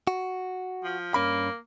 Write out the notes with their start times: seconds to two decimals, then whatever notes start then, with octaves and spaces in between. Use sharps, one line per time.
0.07 F#4
0.84 F3
1.14 G2 A#3 C#4 B5